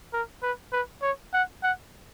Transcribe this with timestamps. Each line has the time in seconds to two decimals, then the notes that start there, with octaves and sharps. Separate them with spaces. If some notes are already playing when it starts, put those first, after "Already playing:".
0.13 A#4
0.43 B4
0.72 B4
1.02 C#5
1.33 F#5
1.63 F#5